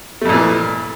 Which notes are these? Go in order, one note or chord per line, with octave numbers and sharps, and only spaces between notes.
F2 A#2 E3 A3